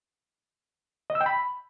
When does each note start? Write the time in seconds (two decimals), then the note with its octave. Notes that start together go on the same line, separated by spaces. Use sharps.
1.10 D#5
1.15 E6
1.21 G5
1.26 B5